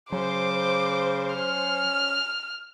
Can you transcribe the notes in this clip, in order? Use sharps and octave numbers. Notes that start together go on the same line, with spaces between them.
C#3 F#3 C5 D6
C#4 F6